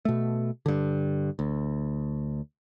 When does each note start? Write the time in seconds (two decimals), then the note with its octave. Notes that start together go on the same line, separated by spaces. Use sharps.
0.05 B2 A3
0.66 G2 D3
1.39 D2